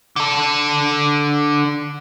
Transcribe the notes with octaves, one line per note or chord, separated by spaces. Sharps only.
D3 A4